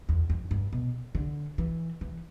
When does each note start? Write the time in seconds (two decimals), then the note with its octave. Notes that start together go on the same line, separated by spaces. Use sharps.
0.09 E2
0.30 F2
0.51 G2
0.73 B2
1.15 D3
1.58 E3
2.01 E3